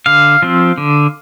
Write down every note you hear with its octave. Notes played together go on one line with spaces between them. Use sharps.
D3 F5
F3 C4
D3